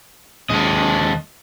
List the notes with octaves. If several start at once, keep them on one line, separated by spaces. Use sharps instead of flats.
D#2 G#3 A4 D#5